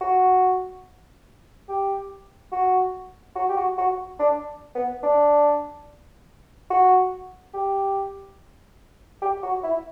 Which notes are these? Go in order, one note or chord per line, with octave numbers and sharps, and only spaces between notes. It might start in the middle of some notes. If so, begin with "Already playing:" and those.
F#4
G4
F#4
F#4
G4
F#4
F#4
D4
B3
D4
F#4
G4
G4
F#4
E4